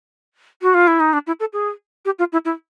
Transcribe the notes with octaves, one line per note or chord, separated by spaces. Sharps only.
F#4
F4
E4
D#4
D4
E4
A4
G#4
G4
F4
E4
E4